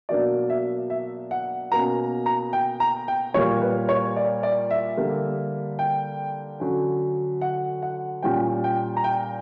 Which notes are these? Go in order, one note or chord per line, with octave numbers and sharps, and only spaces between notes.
B2 F#3 A#3 D4 D5
E5
E5
F#5
B2 A#3 C#4 A#5
A#5
G5
A#5
G5
A#2 G3 A#3 C#5
B4
C#5
D5
D5
E5
D3 G3 A#3
G5
D3 F#3 C#4
F#5
F#5
A#2 G3 C#4 G5
G5
A#5
G5